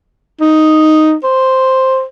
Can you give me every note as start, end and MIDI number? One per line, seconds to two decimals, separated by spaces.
0.41 1.15 63
1.24 2.04 72